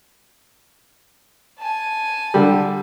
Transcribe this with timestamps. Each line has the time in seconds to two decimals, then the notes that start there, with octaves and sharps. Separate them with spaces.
1.59 G#5 A5
2.34 D3 G3